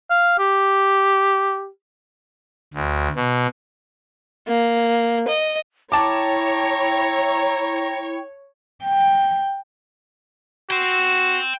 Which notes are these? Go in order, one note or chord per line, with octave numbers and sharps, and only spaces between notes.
F5
G4
D2
B2
A#3
D#5
E4 C#5 G5 A5 A#5 D6
G5
F#4 G5 C6